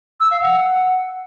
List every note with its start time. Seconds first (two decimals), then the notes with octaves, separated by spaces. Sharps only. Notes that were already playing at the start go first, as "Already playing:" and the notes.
0.20 E6
0.31 F5
0.42 F#5